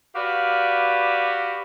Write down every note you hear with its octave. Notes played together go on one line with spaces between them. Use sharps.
F#4 G4 B4 D5 F5